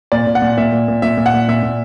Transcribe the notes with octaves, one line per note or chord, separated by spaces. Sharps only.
A#2 D5
A#2
F#5
A#2
A#2 E5
A#2
A#2
A#2 E5
A#2
F#5
A#2
A#2 E5
A#2